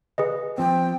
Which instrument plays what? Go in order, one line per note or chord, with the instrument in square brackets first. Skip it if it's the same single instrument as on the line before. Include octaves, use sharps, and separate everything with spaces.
[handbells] G#4 B4 D#5
[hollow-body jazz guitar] F3 C4 [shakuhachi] G5